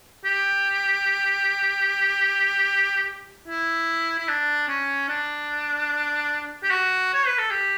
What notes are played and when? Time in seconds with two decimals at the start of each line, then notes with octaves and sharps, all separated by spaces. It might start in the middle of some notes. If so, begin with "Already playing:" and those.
0.25 G4
3.48 E4
4.18 E4
4.28 D4
4.68 C#4
5.09 D4
6.63 G4
6.70 F#4
7.13 C#5
7.26 B4
7.38 A4
7.51 G4